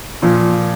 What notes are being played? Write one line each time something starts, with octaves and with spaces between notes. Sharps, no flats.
A#2 F3